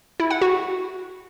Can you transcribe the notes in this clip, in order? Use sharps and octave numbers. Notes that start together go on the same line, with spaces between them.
E4
F#5
F#4